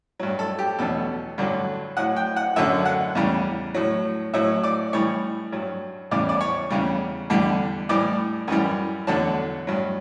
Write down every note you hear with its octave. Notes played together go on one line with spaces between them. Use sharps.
G2 F#3
A4
G4
E2 B2 F#3 A4
G2 D3 F#3
A2 F#3 F#5
G5
F#5
F#2 D3 F#3 E5
F#5
E2 C#3 G3
A2 F#3
A2 F#3 E5
D5
A2 E3 G3 C#5
G2 F#3
E2 C#3 G3 D5
D5
C#5
E2 C#3 G3
E2 D3 G3
A2 E3 G3 D5
F#2 E3 G3
E2 D3 F#3 A5
G2 F#3